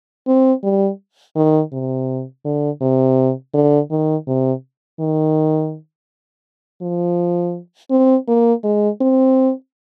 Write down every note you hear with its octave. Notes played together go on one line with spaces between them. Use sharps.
C4
G3
D#3
C3
D3
C3
D3
D#3
C3
D#3
F3
C4
A#3
G#3
C4